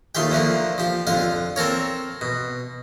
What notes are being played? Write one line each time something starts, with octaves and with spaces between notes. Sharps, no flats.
D#2 A3 F4 G4 G5
D3 F3 A3 A#3
F3 G4
F2 D3 F4 F5
C4 A4 A#4 C#5
B2